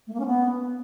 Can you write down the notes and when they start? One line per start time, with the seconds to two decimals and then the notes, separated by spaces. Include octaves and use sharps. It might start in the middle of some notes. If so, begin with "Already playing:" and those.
0.07 A3
0.13 A#3
0.20 C#4
0.26 B3